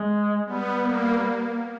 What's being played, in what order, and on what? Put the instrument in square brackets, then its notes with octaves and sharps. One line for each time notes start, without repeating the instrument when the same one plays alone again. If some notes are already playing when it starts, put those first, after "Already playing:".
Already playing: [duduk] G#3
[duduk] G3 [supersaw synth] B3
[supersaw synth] A#3